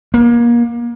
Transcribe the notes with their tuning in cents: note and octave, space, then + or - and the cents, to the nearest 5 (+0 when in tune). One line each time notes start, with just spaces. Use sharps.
A#3 +30